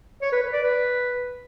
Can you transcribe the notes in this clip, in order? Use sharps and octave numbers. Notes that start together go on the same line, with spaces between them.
C#5
B4
B4
D5
B4